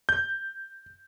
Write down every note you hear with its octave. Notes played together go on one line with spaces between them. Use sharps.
G6